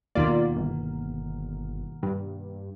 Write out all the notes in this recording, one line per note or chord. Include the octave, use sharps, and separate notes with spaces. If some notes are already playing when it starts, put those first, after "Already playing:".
D#2 B2 D#3 A#3 F4 D5
G1
G2